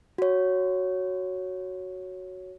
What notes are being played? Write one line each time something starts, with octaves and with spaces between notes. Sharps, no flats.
F#4 C#5